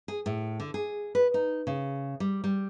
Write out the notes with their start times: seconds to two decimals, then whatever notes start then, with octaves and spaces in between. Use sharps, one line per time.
0.08 G#4
0.26 A2
0.60 D3
0.74 G#4
1.15 B4
1.34 D#4
1.67 C#3
2.20 G3
2.44 G3